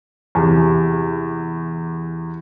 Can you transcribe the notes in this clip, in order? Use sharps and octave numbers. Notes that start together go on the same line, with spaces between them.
E2 C3